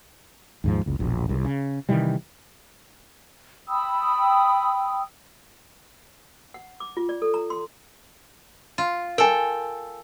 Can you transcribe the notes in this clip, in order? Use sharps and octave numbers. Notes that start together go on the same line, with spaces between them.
D#2 G#2 F3
F#1 C#2
E1 A#1
C2
C#3
C3 D#3 E3 G3
G5 B5 D#6 E6
F#5
D6
F4
D5
A4
A#5
C6
F4
A4 A#4 G5 G#5